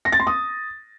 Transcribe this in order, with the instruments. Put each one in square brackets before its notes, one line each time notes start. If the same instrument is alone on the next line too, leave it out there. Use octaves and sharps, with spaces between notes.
[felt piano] A#6
A6
C6
D#6